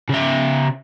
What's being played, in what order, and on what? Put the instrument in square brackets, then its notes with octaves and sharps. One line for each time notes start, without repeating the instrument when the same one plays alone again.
[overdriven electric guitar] C#3 E5